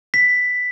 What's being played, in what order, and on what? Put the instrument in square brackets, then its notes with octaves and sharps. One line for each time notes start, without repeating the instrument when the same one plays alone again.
[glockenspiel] B6